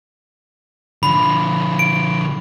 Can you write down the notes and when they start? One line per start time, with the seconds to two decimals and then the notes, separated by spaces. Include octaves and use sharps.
1.03 D3 F3 B5
1.79 D7